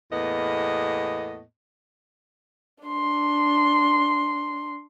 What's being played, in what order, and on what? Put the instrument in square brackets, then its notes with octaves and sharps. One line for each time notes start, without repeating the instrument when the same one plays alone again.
[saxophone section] E2 A2 A#3 B3 D#5
[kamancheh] D4 C6